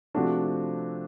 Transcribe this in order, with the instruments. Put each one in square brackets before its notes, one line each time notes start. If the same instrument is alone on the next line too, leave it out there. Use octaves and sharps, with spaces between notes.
[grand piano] C3 F3 A3 D4 F#4